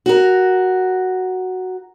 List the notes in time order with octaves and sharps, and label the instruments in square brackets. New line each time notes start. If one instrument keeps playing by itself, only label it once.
[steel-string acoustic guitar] F#4 A#4